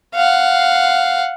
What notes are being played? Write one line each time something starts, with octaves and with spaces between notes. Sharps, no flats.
F5 F#5